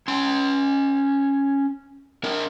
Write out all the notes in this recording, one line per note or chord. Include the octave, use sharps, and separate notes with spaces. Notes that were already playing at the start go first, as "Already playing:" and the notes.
C#4 C6
D4 A#4